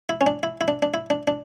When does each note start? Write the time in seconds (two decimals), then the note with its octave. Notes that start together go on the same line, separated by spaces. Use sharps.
0.09 E4
0.21 C#4
0.27 D4
0.43 E4
0.61 E4
0.68 D4
0.82 D4
0.94 E4
1.10 D4
1.28 D4